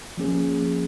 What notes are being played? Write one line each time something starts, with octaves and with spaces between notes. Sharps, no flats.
F3 A#3 C#4 G#4